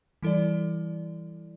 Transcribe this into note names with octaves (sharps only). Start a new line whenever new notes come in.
E3 G3 E4 A4 D5